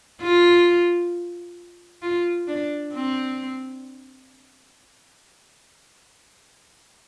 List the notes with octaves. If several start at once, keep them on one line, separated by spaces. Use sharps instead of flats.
F4
F4
D4
C4